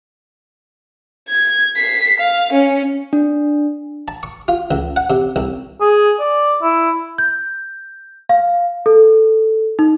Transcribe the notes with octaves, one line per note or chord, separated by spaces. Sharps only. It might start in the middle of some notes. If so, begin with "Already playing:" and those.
G#6
B6 C7
F5
C#4
D4
A5
C#6
F4
C#2
F#5
C3
C2
G#4
D5
E4
G6
F5
A4
D#4